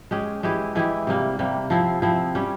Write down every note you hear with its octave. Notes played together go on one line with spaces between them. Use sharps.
G#3 C#4 G4
E3 G#3 E4 G4
E3 G#3 E4 G4
C3 G3 A#3
C3 G3 A#3
F3 C4 E4
F3 C4 E4
G3 C#4 G4